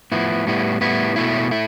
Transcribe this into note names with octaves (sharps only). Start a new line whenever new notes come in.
A2 F3 B3 E4
A2 G3 B3 E4
A2 G3 B3 E4
B2 A3 E4
A3 E4